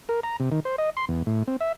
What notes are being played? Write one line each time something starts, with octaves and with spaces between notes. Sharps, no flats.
A#4
A#5
C3
D#3
C5
D#5
C6
E2
A2
C4
E5